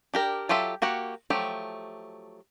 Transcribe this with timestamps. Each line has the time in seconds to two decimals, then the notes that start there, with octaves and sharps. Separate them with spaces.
0.14 D4 G4 A#4
0.49 F#3 F4 G4 A4 E5
0.82 A#3 F#4 G4 F#5
1.30 F3 F#3 A3 G4